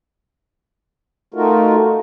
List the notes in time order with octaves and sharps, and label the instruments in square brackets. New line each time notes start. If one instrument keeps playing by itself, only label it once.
[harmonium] A3 D#4 F4 F#4 A#4